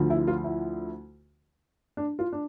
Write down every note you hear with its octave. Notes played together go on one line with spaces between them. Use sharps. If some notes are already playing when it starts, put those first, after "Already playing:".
Already playing: D2 D3 F3
E4
F4
E4
D4
F4
D4